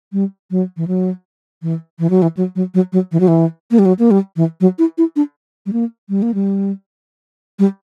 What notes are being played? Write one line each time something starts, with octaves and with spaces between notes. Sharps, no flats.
G3
F#3
E3
F#3
E3
E3
F#3
E3
F#3
F#3
F#3
F#3
E3
F#3
E3
A#3
G3
F#3
A#3
G3
E3
F#3
E4
E4
D4
G3
A#3
G3
A#3
G3
G3